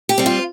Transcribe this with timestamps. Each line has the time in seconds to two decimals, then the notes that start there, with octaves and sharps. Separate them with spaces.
0.09 G4
0.18 G3 C4
0.26 F4